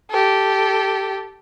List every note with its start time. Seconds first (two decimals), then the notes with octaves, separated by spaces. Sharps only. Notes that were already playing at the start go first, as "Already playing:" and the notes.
0.11 G4 A4